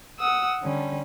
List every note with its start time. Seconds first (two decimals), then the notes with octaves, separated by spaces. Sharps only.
0.19 F#5 D#6 E6
0.62 D3 G3 C#4